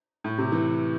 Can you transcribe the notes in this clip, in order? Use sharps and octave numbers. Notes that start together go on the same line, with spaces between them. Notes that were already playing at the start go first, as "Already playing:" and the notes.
A2
C3
E3